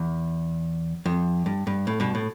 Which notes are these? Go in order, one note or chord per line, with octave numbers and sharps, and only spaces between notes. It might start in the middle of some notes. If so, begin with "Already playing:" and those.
Already playing: E2
F2
G2
G2
A2
G2 B2
A2